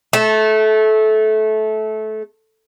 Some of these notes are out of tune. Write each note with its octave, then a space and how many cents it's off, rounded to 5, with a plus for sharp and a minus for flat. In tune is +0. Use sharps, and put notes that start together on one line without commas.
A3 -20 A5 +0